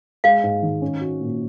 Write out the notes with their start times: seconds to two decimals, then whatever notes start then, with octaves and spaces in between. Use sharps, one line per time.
0.24 G#3 F5
0.43 G#2
0.62 D#3
0.82 C#4
1.01 F#4
1.21 A#2